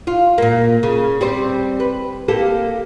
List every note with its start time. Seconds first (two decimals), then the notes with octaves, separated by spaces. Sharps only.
0.07 F4
0.38 A#2 A#3
0.83 C#3
1.21 G3 C4 C5
1.80 B4
2.28 A#3 G4 A4